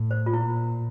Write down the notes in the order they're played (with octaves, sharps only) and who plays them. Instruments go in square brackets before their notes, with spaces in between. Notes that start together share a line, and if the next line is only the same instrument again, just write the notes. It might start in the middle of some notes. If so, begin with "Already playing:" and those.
Already playing: [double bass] A2
[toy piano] C5
F4
[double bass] A#2 [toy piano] E4